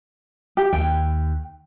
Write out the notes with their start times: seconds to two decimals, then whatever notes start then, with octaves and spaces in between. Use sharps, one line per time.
0.57 G4
0.73 D#2 G5